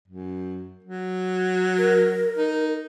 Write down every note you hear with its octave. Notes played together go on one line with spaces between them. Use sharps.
F#2
F#3
A#4
D#4